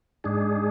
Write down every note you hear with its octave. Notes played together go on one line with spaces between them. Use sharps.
G#2 G#3 D4 G#4